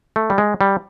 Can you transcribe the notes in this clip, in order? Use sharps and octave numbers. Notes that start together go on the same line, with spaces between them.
A3
G3
G#3
G3